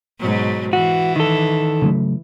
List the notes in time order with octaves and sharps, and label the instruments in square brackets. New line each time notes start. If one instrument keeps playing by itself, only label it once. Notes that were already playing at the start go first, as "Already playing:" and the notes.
[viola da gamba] G#2 B2 F#3
[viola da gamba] E3 [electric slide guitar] F#4
[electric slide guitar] D#3 A4
[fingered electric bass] C#3 F#3 A3